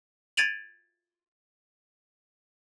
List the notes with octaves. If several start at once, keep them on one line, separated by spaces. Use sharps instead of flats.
G#6 A6 D7 D#7 F7 F#7